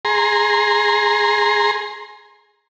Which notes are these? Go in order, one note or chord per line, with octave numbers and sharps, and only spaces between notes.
G#4 A#5 C6